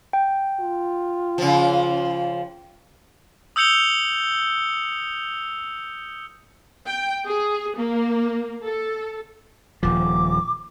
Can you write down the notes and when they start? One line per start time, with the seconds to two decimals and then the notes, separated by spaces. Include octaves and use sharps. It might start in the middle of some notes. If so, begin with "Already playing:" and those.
0.13 G5
0.60 F4
1.38 C#3 F3
3.56 D#6 E6 G6 C#7 F7 G7
6.86 G5
7.27 G#4
7.77 A#3
8.65 A4
9.83 D#1 F3 D6